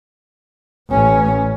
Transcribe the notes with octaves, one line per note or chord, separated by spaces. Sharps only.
A1 C#4